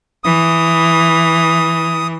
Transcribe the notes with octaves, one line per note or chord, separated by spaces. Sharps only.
E3 D#6